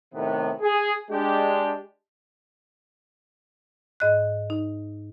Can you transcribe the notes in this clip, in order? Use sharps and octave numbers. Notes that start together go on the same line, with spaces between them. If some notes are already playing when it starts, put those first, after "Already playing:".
A2 C3 D#3 B3
G#4
G#3 D4 G4
G#2 D#5 F#6
D#4